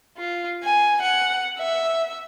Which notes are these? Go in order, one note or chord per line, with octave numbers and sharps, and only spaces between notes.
F4
G#5
F#5
E5